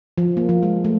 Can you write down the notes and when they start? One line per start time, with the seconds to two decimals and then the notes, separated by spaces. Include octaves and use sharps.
0.18 F3
0.37 A#3
0.49 F3
0.63 G#3
0.84 A3